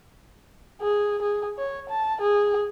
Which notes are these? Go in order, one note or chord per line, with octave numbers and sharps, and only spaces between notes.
G#4
G#4
C#5
A5
G#4